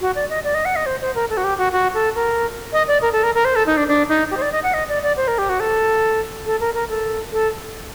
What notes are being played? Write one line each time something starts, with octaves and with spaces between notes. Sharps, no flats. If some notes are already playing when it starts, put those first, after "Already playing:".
F#4
D5
D#5
D5
D#5
F#5
D#5
C5
C5
A#4
A4
F#4
G4
F#4
F#4
A4
A#4
D#5
D5
A#4
A4
A#4
A#4
C5
A4
D#4
D4
D4
D#4
G4
C5
D5
D#5
F#5
D#5
D5
D5
C5
A#4
G4
F#4
A4
A4
A#4
A#4
A4
A4